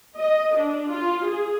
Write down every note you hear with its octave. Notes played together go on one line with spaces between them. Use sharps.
D#5
D4
F4
G#4